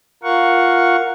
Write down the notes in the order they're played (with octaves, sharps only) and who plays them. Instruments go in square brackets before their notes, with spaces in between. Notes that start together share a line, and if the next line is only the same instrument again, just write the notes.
[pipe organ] F4 A#4 F5 F#5 C#6